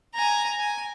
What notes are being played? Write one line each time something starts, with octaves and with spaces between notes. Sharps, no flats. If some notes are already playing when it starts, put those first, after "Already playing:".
G#5 A#5
G#5